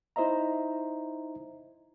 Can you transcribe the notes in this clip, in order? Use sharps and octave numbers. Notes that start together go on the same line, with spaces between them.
D#4 E4 C5 D#5 E5 A#5